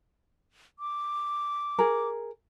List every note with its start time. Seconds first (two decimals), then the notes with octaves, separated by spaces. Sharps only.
0.79 D6
1.79 G#4 A#4